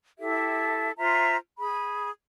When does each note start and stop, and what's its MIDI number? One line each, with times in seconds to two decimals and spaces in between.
0.18 0.91 64
0.18 0.91 67
0.18 0.91 69
0.18 0.91 76
0.97 1.36 65
0.97 1.36 72
0.97 1.36 76
0.97 1.36 82
1.58 2.09 68
1.58 2.09 83